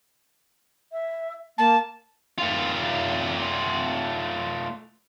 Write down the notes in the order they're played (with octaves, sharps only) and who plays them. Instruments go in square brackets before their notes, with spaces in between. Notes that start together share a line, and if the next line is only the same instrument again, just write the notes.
[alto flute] E5
[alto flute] A#3 [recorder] A5
[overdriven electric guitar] A3 F4